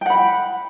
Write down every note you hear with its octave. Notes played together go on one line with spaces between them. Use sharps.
F#5 G5 B5